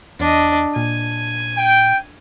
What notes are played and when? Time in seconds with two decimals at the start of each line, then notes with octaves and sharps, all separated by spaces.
0.20 E2 D4 D#5
0.76 A#2 G#5
1.58 G5